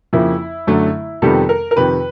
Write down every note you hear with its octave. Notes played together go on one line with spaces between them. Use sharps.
F2 C#3 F3 A#3 E4
F#2 D3 F#3 A3
F2 C3 D#3 G3 B3 A4
A#4
A#4
F2 C3 D#3 B4